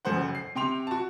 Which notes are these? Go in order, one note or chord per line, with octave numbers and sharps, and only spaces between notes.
F#1 F#2 A4 C5 F#5
C7
C3 G5 C6 F7
F#4 A5